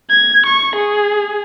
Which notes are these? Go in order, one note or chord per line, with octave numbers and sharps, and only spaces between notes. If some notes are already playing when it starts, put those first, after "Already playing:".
G#6
C#6
G#4